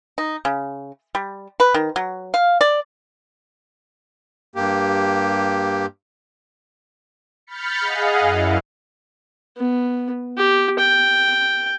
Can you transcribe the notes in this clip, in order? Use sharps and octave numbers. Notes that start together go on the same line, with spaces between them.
D#4
C#3
G3
B4
D#3
F#3
F5
D5
G2 A#3 G4
B5 F6 G6 A6 B6 C#7
G#4 D#5 F5 F#5
F#2 E4
B3
G4
G5